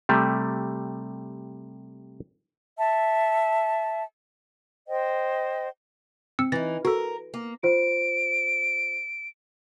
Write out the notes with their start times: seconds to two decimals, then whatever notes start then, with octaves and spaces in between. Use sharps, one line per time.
0.09 C3 G3 A3
2.78 E5 A5
4.87 C5 D#5 G5
6.39 C4 E6 C#7
6.52 E3 D#4 A6 A#6
6.85 F#4 A4 A#4
7.34 A#3
7.63 F4 C5 D7